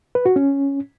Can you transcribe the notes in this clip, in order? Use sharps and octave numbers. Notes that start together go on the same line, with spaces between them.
B4
F#4
C#4